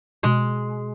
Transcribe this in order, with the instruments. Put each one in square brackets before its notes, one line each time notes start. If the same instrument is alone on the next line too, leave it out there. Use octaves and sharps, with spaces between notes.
[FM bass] B2 [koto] G#3